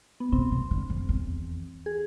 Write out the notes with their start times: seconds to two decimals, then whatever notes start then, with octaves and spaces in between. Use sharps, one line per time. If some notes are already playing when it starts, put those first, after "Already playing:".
0.20 B3
0.32 B2 C4
0.52 C3
0.71 D3
0.90 F2
1.09 E2
1.86 G#4